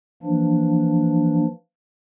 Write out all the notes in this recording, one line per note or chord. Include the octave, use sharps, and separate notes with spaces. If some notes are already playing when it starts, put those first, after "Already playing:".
E3 F3 A#3 D4